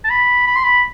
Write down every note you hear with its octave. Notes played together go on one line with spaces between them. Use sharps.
A5
B5
B5
C6
B5